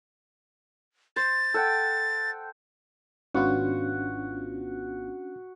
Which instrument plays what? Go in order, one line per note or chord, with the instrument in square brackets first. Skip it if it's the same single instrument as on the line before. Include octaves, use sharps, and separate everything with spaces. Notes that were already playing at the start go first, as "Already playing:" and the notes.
[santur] C5 [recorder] A6
[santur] A4 F#5 G5
[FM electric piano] G#1 B3 F4 [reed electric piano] C#4 D4 [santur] F#4